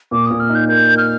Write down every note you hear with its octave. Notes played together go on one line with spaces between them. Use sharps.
A#2 D6
A#2 D#6
F6
D#4
G6
A#4 G6
A#4
F6